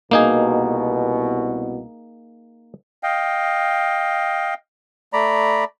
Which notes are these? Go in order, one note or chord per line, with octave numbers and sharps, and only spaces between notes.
C2 B2 A#3 D#4 G#4
D#5 F5 G5
A3 D5 A#5 B5